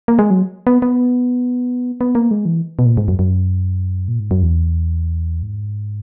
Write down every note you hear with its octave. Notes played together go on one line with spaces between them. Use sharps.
A#3
G#3
F#3
B3
B3
B3
A#3
G#3
E3
B2
A#2
G#2
F#2
F#2
A#2
G#2
F#2
E2
G#2